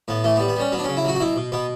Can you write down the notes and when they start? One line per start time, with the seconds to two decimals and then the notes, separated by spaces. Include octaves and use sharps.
0.08 A2 B3
0.24 E3 A3
0.36 B3
0.40 G3
0.48 B3
0.56 G3 C#4
0.72 F#3 B3
0.79 D4
0.84 C#3 C#4
0.97 E4
1.05 F#3 F#4
1.15 F#4
1.20 B2 E4
1.36 B2
1.52 B2 B3